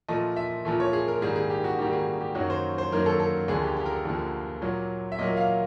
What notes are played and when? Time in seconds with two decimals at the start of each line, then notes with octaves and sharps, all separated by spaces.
0.08 A#2 F3 A3 D#5
0.36 E5
0.65 A#2 F3 A3
0.80 C#5
0.93 G#4
1.08 A#4
1.21 G#2 D#3 G3 A#3 G#4
1.36 G#4
1.50 G4
1.64 F#4
1.78 G#2 D#3 G3 A#3 G4
1.93 G#4
2.21 G4
2.35 F#2 D#3 F#3 A#3 F#4
2.50 C5
2.78 C5
2.92 F#2 D#3 F#3 A#3 A#4
3.06 A4
3.20 A4
3.48 D2 D3 F3 A#3 G#4
3.63 G4
3.77 G4
3.86 A#4
3.91 A4
4.05 D2 D3 F3 A#3
4.62 A#2 F#3 A#3
5.12 E5
5.19 A#2 F#3 A#3 D#5
5.37 F5